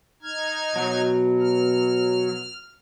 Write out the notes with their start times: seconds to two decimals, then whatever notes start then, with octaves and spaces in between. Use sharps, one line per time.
0.23 D#4 F6 G#6
0.75 B2 F#3
1.40 F6